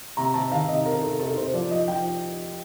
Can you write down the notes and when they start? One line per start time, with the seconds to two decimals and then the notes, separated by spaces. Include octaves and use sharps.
0.17 C3 A#5
0.34 C3 A5
0.51 D#3 F5
0.69 C3 D#5
0.86 C3 A#4
1.03 C3 A4
1.19 C3 A4
1.36 C3 C5
1.53 F3 D5
1.71 F3 D#5
1.88 F3 G5